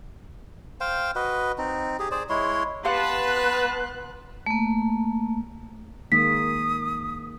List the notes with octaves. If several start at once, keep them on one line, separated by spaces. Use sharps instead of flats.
C5 F5 G5
F#4 B4 D#5
C4 D#4
G4 G#4
G#4 C5 D5
G#3 E4 C#5 C6
B3 G4 B4 F5 F#5 A5 C6 F#6
A3 A#3
D#3 G#3 A#3 D#6 B6